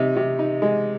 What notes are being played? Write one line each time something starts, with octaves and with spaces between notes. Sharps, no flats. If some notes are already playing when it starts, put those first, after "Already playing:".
Already playing: C3 D#4
C3
D#4
G#3